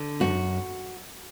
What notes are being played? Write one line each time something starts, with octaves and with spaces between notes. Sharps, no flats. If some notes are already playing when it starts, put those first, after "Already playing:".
Already playing: D3
F#2 F#4